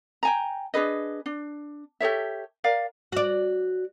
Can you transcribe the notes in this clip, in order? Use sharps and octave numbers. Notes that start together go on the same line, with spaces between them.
G5 G#5 A#5
D4 G#4 B4 D#5
D4
G4 A4 C#5 E5
A#4 D5 F5
F#4 D5